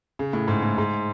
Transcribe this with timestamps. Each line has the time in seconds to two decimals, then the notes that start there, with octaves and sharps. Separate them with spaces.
0.19 C#3
0.33 A2
0.48 G#2
0.63 A2
0.78 G#2